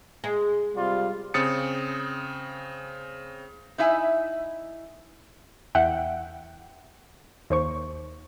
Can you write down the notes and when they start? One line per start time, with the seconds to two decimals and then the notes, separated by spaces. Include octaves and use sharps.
0.24 G#3
0.76 C3 G3 F4
1.34 C#3 C4 D#6 A6 C#7
3.78 D#4 E4 E5 G#5
5.75 E2 E5 F#5 G5
7.50 D#2 C5 C#6